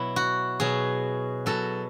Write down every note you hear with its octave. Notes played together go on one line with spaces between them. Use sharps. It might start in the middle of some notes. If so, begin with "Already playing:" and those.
Already playing: B2 F#3 E4
F#4
B2 F#3 G#4
B2 F#3 A4